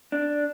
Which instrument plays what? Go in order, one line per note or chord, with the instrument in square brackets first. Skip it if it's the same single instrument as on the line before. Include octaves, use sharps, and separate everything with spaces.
[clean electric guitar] D4